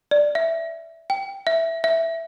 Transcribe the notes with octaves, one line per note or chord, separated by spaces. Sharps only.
D5
E5
G5
E5
E5